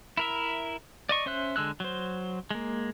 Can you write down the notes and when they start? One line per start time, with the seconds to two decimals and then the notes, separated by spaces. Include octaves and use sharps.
0.17 E4 A#4 E5
1.09 D5 D#5 C#6
1.26 C#4 C5 E5 F#6
1.56 D3 G#3 E6 F#6
1.80 F#3 C5
2.51 G#3 A#3